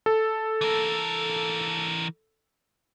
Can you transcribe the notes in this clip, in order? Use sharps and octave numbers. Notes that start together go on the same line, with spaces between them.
A4
E3 A#4